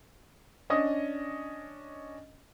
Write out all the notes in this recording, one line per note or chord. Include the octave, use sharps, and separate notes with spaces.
C#4 D4 D#5 D#6